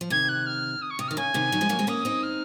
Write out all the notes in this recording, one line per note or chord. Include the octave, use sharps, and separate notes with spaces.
F3
C3 D#3 G#6
F#6
F6
D#6
C#6
C3 D#6
D#3 F6
C#3 G#5
C3 D#3
D#3 F#3
F3 G#3
F#3 A#3
G#3 C4
A#3 C#4 D#6
C4 D#4
F6